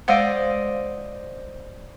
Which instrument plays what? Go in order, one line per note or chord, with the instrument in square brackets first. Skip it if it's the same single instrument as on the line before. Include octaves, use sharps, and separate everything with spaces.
[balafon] G#3 F5 F#5 [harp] C5 D5 D#5